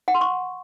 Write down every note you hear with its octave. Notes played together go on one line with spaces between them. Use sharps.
F#5
C6
C#6